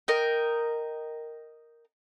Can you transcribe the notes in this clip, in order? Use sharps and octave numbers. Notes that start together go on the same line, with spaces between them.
A#4 D#5 G5